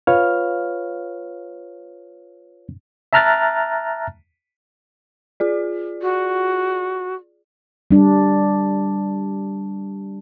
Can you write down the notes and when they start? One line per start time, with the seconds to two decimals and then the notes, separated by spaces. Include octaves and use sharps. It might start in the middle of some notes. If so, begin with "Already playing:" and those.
0.07 F4 B4 C#5 F5 F6
3.13 E5 A5 A#5 F6 F#6 A6
5.40 F4 G#4 D5
6.02 F#4
7.91 G3 D4